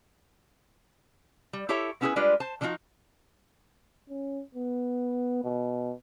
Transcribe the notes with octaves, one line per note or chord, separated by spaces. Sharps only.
G3
E4 G4 A4 C#5 E5
B3 C#4 E4 F#4 G#4 B4
G3 G#3 D4 F4 B4 D5
C5 A5
D3 F3 G#3 D#4 F4 F#4
C#4
B3
B2